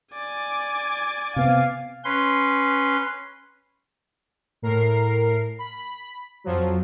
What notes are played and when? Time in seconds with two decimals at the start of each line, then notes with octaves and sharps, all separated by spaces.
0.13 D5 G#5
1.36 C3 B3 C4 F5
2.04 C#4 B4 C6
4.62 A2 A#4 C7
5.59 B5
6.44 F2 F3 F#3